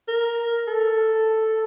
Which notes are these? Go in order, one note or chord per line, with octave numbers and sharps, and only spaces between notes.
A#4
A4